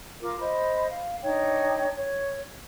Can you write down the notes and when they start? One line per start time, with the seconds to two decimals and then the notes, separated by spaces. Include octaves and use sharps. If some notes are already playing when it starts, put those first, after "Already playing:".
0.21 F4 A#4 D6
0.40 C5 D#5 B5
0.90 F5
1.23 D4 D#4 C#5 G5
1.96 C#5